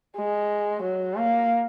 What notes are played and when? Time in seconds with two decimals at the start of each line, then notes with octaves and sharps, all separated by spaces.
0.17 G#3
0.82 F#3
1.16 A#3